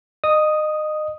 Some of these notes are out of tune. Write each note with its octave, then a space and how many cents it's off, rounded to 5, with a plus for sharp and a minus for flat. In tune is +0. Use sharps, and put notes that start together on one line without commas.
D#5 -25 D#6 +0